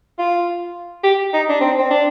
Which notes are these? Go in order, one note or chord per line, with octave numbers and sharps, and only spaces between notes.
F4
G4
D#4
D4
C4
C4
D4